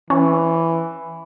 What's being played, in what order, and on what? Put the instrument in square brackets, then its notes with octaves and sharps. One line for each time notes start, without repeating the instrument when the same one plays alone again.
[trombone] E3 [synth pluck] C#4